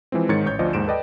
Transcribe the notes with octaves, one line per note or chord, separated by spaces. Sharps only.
E3 F3 G#3 C4
G#2 D#3 C#5 G#6 A6 C#7
A1 C#5 G6
D2 F3 D5 D#5
D#2 G#2 D7 E7
A4 B4 D5 D#5 G5